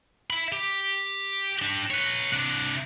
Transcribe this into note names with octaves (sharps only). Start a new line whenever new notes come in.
E5 B5
G4
D4 G4
B4 C#5
C3 D4